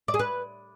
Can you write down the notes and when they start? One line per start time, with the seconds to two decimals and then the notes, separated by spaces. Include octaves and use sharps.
0.08 D5
0.14 G#4
0.19 B4